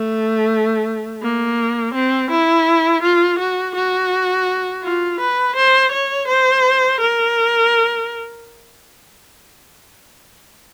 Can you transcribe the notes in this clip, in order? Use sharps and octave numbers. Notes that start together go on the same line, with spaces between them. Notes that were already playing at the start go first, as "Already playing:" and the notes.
Already playing: A3
A#3
C4
E4
F4
F#4
F#4
F4
B4
C5
C#5
C5
A#4